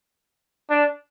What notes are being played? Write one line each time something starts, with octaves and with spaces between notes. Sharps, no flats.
D4